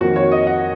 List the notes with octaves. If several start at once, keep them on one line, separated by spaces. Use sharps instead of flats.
F2 D#3 A#3 F#4
C#5
D#5
F#5